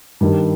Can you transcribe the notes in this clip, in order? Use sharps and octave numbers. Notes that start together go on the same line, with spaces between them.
G2 D#3 G3